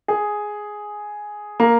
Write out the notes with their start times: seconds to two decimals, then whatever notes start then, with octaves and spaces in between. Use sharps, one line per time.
0.08 G#4
1.60 A#3